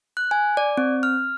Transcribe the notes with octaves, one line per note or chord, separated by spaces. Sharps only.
F#6
G#5
D5
C4
F6